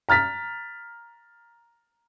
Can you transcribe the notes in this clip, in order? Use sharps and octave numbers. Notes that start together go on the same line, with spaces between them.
A#5 F6 A6 B6